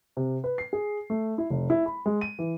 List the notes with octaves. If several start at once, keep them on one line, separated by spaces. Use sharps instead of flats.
C3
B4
C7
G#4
A3
E4
F1
E4
B5
G#3
D#7
E3